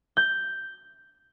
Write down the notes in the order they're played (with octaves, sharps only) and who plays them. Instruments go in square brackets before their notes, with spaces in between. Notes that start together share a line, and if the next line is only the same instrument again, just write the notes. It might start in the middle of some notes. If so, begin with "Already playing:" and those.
[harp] G6